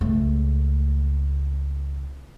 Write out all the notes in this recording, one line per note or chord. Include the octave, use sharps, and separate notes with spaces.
C#2 A3